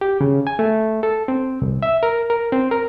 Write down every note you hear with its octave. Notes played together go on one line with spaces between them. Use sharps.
G4
C#3
G#5
A3
A4
C4
C2
E5
A#4
A#4
C4
A#4